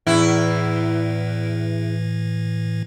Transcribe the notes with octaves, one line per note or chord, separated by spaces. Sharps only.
E2 A2 E3 E4